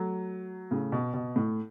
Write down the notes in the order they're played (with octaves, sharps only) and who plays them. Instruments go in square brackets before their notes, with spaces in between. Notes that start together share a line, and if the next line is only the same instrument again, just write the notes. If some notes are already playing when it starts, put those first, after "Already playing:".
Already playing: [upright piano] F#3 A3
A2 C#3
B2
B2
A2